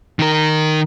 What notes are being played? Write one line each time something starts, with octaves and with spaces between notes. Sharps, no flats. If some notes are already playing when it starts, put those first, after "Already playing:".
D#3 A#4